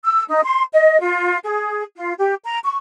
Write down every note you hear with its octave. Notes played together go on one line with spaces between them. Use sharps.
E6
D#4
C6
D#5
F4
G#4
F4
G4
A#5
C#6